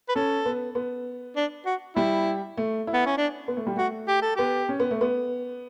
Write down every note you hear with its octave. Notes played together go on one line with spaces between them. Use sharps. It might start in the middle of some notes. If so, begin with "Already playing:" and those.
B4
C#4 A4
B3
B3
D4
F#4
G3 E4
A3
E4
B3
C#4
D4
B3
A3
G3
A3 F#4
G4
A4
B3 G4
C#4
B3
A3
B3